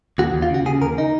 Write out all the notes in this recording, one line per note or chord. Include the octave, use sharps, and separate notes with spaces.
D#2 F#4
D#2
F4
C#3 F#4
C#3 G#4
D#2 A#4
D#4